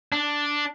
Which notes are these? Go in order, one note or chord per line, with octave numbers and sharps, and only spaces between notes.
D4